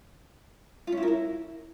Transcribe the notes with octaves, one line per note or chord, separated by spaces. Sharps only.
F4
C#4
E4
A#4
E4